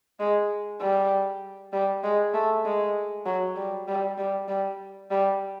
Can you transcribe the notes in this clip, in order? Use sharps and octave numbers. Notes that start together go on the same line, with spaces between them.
G#3
G3
G3
G#3
A3
G#3
F#3
G3
G3
G3
G3
G3